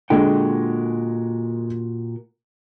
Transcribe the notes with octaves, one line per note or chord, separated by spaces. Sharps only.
A#2 D3 G#3 F#4 G5